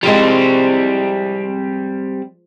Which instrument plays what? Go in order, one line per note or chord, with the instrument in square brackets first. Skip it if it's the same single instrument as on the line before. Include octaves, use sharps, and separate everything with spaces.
[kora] F3 G#3 [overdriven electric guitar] G3 C4